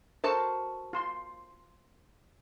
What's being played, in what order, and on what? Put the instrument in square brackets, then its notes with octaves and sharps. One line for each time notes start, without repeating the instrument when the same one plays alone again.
[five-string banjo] F#4 A4 A5 [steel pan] A#4 C5
[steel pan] F4 C6